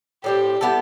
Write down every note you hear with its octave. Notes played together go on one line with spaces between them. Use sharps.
A2 G3 C4 G4
G3 B3 E4 A4